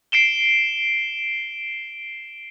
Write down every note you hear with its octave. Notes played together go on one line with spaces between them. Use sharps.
C7 D7 E7 G7